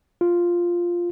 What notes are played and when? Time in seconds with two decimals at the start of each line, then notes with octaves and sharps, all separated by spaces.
0.21 F4